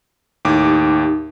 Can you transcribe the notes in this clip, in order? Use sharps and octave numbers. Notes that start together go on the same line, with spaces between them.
D#2 A2 D#4 G4 D6